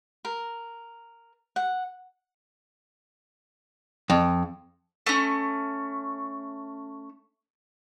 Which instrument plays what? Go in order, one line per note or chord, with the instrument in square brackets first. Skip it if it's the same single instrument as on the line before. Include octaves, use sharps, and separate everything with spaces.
[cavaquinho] A#4
F#5
[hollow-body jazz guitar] F2
[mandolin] A3 C#4